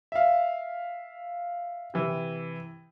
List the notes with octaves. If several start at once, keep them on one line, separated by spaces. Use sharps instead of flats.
E5 F5
C3 E3